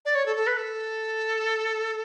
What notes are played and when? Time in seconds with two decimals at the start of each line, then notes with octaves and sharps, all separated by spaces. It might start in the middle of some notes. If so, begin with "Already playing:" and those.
0.05 D5
0.15 C#5
0.26 A4
0.36 A4
0.47 B4
0.57 A4